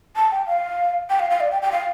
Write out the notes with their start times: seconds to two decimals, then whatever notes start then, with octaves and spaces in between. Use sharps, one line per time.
0.16 A5
0.31 G5
0.47 F5
1.10 G5
1.20 F5
1.30 F5
1.40 D5
1.51 G5
1.62 G5
1.72 F5